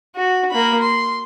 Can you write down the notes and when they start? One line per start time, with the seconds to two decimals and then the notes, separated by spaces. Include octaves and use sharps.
0.16 F#4
0.51 A#3 B5
0.81 C6